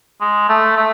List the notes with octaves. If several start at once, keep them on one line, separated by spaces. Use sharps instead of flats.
G#3
A3
A3